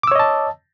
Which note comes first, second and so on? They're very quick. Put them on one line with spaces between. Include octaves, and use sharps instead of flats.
D6 E6 C#5 D#5 A5